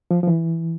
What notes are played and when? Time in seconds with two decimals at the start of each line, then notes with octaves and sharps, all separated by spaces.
0.11 F3
0.23 F3
0.27 E3